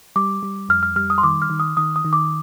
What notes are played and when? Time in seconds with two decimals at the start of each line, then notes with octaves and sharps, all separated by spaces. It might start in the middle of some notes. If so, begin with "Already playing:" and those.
0.16 G3 D6
0.43 G3
0.69 F2 F6
0.83 F6
0.96 G3 F6
1.10 D#6
1.18 C6
1.24 D#3 D6
1.42 F6
1.50 D#3
1.60 D#6
1.77 D#3 D#6
1.96 D#6
2.05 D#3
2.13 D6